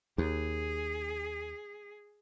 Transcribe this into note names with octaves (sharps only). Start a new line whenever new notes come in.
D#2 G#4